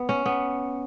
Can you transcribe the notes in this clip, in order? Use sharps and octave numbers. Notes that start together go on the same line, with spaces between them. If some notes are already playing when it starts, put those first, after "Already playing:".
Already playing: B3
C#4
B3